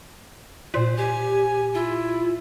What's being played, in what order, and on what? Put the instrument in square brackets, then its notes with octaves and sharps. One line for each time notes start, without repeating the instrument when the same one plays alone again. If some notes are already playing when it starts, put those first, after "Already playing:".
[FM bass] A#2 [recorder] C5
[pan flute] G4 [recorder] G#5
[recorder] E4 [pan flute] F4